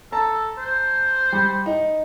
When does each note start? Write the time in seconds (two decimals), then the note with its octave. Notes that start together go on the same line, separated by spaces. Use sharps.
0.12 A4 A5 A#5
0.58 C5
1.32 G3
1.66 D#4